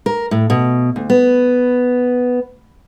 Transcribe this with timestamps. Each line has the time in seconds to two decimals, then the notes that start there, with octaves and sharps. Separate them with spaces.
0.06 A#4
0.31 A2
0.50 B2
0.96 D2
1.10 B3